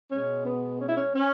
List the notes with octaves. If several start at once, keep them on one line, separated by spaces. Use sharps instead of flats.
B2 G#3 C#4
B3
C#4
E4
C#4
C#4